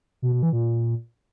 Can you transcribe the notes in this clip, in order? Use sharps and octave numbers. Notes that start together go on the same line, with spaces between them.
B2
B2
E3
A#2